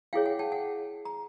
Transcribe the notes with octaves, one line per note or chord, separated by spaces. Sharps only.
E4 G#4 C#5 F5 G5
F#5 G#5
G5 A5
F#5 G#5
A#5